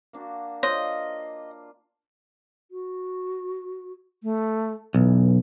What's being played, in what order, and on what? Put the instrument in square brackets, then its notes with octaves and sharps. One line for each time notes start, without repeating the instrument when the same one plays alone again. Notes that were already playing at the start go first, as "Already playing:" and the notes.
[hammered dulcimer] A#3 D4 F#4
[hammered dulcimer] F4 [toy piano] C5 C#5 C6 [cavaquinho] D#5
[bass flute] F#4
A3
[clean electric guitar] B1 [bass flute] E3